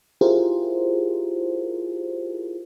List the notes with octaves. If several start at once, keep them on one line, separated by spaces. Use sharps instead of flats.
E4 F4 G4 G#4 A#4 C5